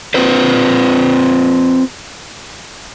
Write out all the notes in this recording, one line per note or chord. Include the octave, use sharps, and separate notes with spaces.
C4 F4 B4 C5